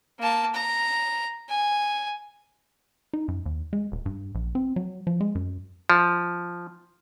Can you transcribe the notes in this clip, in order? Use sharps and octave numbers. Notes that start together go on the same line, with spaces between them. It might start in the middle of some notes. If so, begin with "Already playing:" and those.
A#3 A5
A#5
G#5
D#4
F#2
D#2
G#3
D#1
G2
A#1
C4
F#3
F3
G#3
F#2
F3